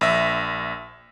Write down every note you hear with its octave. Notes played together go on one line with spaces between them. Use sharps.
A#1 E5